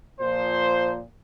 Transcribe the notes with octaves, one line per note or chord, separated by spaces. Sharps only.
A#2 F3 C5